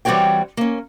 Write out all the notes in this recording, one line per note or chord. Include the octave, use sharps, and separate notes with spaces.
E3 G3 C4 F#4 C#5 G5
A#3 C#4